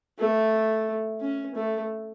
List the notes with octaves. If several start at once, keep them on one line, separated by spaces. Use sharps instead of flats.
A3
C#4
A3